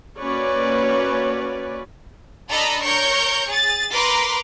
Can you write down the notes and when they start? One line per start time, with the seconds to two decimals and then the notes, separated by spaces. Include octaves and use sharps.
0.19 A#3 C#4 F#4 B4 C#5 D5
2.49 D4 A4 D#5 A#5 B5
2.84 A#4 C#5 C#6 G6
3.50 G#4 A6
3.92 A#4 B4 A#5 C6 D6